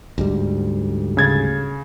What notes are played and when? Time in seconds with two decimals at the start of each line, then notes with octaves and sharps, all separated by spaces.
0.18 D2 G#2 G3
1.17 C#3 G#6 A6